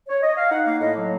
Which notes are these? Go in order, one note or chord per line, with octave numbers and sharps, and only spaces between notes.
C#5
D#5
F5
D#4 F#5
A#3 F5
A2 D#5
F#3